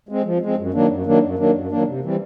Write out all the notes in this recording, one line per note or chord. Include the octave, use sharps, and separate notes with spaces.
G#3 C4
F3
G#3 C4
F#2
D#3 F#3 A#3 D4
F#2
D#3 F#3 A#3 D4
F#2
D#3 F#3 A#3 D4
F#2
D#3 F#3 A#3 D4
C3
E3 G3 C4